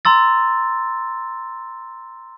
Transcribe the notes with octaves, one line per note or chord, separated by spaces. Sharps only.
A#5 C6 E6 A6